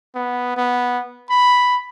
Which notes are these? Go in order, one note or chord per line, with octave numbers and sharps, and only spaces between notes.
B3
B3
B5